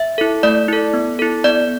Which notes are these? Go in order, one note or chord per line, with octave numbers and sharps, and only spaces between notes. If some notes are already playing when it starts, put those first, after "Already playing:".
Already playing: E5
E4 A4
A3 D5
E4 A4
B3
E4 A4
B3 D5